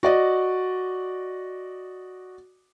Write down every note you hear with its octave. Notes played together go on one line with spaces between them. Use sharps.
F#4 D5 D#5